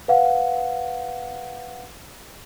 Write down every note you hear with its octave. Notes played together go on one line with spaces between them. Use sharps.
B4 F5 F#5